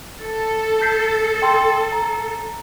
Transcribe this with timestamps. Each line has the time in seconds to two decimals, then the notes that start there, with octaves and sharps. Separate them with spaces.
0.21 A4
0.81 G6 B6 C7
1.42 G5 C6
1.92 A#5